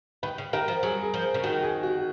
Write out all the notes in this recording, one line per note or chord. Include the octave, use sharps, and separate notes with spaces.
D#3 B4
C#3
D#3 A#4
F3
F#3 G#4
G#4
F3
G#4
C#3
D#3 F#4
G#4
F#4